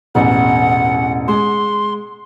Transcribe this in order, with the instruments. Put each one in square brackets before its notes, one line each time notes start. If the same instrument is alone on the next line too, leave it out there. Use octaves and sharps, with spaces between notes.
[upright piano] E1 A1 [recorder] F#5
[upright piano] G#3 [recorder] C6